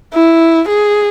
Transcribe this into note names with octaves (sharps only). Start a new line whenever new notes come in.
E4
G#4